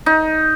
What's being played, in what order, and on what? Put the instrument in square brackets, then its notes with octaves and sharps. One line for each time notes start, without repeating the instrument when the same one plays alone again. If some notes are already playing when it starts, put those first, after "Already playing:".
[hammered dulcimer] D#4